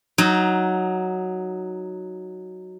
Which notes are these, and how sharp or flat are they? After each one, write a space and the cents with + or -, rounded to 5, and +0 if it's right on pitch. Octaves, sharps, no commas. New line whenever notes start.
F#3 +0 D#4 +5